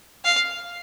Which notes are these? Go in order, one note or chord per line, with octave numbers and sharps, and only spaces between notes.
F5